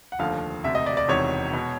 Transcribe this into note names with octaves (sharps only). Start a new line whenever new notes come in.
F#5
F1 D#2 D3 F3 F5
E1 D2 C3 E5
D#5
D5
D5
E1 E2 C3 D#3 C#5
B2